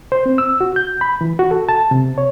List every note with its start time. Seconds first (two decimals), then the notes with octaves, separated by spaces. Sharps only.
0.12 C5
0.26 C4
0.38 E6
0.61 F#4
0.76 G6
1.01 B5
1.21 E3
1.39 F#4
1.51 A4
1.69 A5
1.91 C3
2.18 C#5